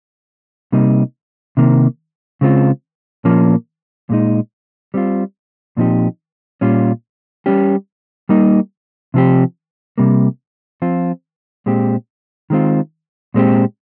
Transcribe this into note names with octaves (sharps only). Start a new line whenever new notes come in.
C3 G3 A#3 D#4
C3 D#3 A#3
C#3 G#3 C4 F4
A#2 F3 A#3 C#4
A#2 G#3 D#4
G3 C4 F4
A#2 F3 C4 D#4 G4
A#2 G3 C#4 F4
G3 C#4 G4
G3 A#3 D#4
C3 F3 C4 G4
C3 G3 A#3
F3 C4 F4
A#2 G#3 C4 G4
D#3 G#3 C4 F4
A#2 G#3 C4 G4